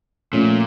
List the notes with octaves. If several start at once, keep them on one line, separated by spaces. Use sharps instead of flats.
A#2 F3 A3 C#4